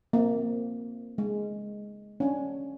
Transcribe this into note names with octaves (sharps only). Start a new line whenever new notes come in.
A#3 C4
G#3
C#4 D4